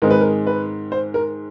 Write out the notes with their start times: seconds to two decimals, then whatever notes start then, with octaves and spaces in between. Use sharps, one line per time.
0.02 G#2 D#3 G#3 C4 D#4 A#4
0.11 B4
0.21 A#4
0.47 B4
0.92 C5
1.14 A#4